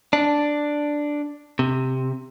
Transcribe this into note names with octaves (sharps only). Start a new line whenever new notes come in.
D4
C3